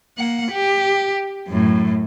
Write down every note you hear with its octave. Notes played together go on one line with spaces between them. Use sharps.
A#3 F#5
G4
F#2 A2